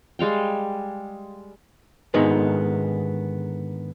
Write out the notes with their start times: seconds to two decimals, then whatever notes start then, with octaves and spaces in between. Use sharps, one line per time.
0.19 G3 G#3 F5 G5
2.14 G#2 D3 D#3 G#3 B3